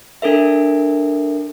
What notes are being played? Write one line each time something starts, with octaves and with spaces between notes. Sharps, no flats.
D4 A4 A#4 E5